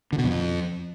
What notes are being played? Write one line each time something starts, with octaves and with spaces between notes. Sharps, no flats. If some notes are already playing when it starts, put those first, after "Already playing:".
D3
B2
F2